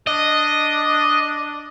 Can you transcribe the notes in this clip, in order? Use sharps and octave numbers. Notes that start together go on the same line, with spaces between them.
D4 D#5